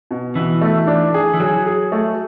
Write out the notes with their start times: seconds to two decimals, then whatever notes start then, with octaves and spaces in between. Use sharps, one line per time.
0.11 B2
0.35 B2 E3
0.61 A3
0.87 D4
1.14 G#4
1.34 E3
1.40 F#3 G#4
1.66 G#4
1.92 A3